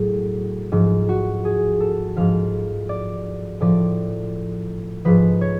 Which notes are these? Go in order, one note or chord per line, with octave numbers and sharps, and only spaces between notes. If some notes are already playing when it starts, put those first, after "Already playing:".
Already playing: A2 F#3 G#4
G#2 F3
F#4
G#4
A4
G#2 F3 F5
D5
A2 F3 D5
G#2 F3 B4
C#5